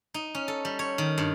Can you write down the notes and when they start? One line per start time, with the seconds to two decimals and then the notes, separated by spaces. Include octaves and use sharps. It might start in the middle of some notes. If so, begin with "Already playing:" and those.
0.14 D#4
0.35 C#4
0.48 A4
0.65 G3
0.79 C#5
0.98 D#3
1.18 G2